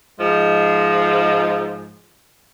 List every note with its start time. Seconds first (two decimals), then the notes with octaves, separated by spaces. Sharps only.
0.19 G#2 F3 G#3